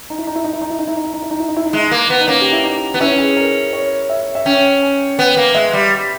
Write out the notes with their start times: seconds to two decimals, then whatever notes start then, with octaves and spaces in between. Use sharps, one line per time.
0.10 D#4
0.18 E4
0.27 D#4
0.36 E4
0.44 D#4
0.53 E4
0.62 D#4
0.70 E4
0.79 D#4
0.87 E4
0.97 D#4
1.05 E4
1.13 D#4
1.22 E4
1.31 D#4
1.40 E4
1.48 D#4
1.57 E4
1.66 D#4
1.73 G#3 E4
1.82 D#4
1.91 A#3
2.10 B3
2.21 D#4
2.28 A#3 C#4
2.41 G4
2.52 E4
2.64 D#4
2.94 B3
3.00 C#4 E4
3.18 G#4
3.37 A#4
3.73 C#5
4.10 E5
4.35 E5
4.46 C#4 G5
4.82 G#5
5.19 B3 G5
5.37 A#3
5.54 G#3 E5
5.73 G3